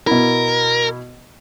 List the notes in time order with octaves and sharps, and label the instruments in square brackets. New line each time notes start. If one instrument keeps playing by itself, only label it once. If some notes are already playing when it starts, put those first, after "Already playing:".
[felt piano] B2 E4 [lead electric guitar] A#4